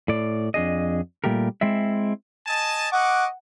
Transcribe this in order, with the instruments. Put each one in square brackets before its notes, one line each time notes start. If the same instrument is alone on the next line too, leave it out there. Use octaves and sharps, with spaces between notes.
[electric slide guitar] A2 D5
F2 D4 G#4 D#5
A#2 G3 A3 G4 A#4
G#3 C4 E4 E5
[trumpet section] D#5 G#5 A5
[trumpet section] D#5 C#6 D6 [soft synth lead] F#5